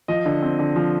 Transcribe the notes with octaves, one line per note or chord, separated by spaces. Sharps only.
F3 D#5
D3
C4
D3
F3